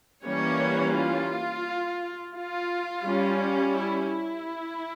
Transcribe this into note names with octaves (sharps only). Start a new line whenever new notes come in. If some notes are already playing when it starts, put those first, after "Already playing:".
E3 G3 A#3 C#4 C#5
F4
F4
G3 C#4
E4
E4